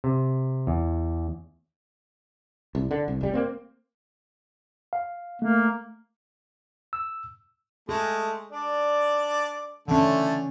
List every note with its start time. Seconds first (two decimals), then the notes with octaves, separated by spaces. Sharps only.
0.04 C3
0.67 E2
2.75 C2
2.91 D3
3.08 C2
3.21 F1 G3
3.33 A#3 C4
4.93 F5
5.42 A3 A#3
6.93 E6
7.89 G#3 A3 G#4
8.52 D4 D5
9.88 D3 E3 A3 C#4